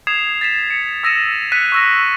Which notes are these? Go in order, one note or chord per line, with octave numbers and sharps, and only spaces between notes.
D#6 G#6 C7 E7 F7
A6 B6 E7
C#7
D#6 E6 A#6 C#7 D#7 E7
F#6 B6 C#7 D#7
C#6 E6 A#6